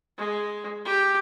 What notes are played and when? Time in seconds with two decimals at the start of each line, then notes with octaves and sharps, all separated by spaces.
0.18 G#3
0.85 G4